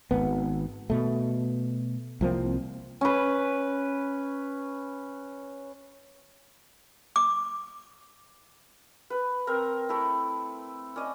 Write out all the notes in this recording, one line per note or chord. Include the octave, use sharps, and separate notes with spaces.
G#1 B3
B2 A3
C2 F3 A#3 C4
C#4 B4
D6
B4
C4 A#4 A#5
A3 E4
C#4 D5 D#5